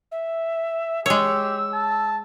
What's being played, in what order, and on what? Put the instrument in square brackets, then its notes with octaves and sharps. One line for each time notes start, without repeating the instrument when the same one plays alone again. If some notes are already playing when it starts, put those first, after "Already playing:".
[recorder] E5
[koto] G#3 C#5 [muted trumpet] G4 [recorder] E6
[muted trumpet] A5